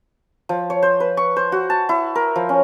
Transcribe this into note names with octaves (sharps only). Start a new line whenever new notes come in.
F3
C#5
C5
B4
C#6
C5
F#4
A5
E4
A#4
F3
C#4